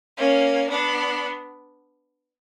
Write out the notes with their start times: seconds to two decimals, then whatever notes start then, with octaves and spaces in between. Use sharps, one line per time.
0.17 A#3 C#4
0.69 B3 D4